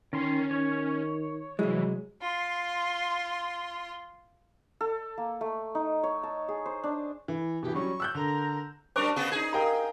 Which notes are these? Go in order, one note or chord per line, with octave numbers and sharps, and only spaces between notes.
D#3 C#4 C6
D#3 C#5
C2 E3 F#3 G#3
F4 C6
A4
A#3
A3
D#4
C#5
A5
G#4
C5
D4
E3
B2 E3 G4
F#3 G3 C#4 C#6
E6 F#6 G6
D3 A#4
G3 D4 A#4 C5 C#6 D6 D7 F7
C#3 B3 G#4
D#4 G#4 G#6
G4 A#4 F5 G5 A#5 D#6